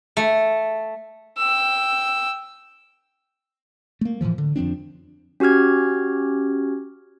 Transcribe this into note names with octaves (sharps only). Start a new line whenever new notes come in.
A3
G5 E6
A3 A#3
A2 C#3 E3 F3
D3
F2 F3 C4 D4
C#4 F#4 G4 F6 G#6